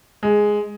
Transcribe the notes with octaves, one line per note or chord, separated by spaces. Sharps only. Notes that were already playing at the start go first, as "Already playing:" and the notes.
G#3